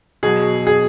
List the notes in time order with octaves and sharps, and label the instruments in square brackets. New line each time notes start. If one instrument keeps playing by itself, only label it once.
[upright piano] B2 F#3 G#4
G#4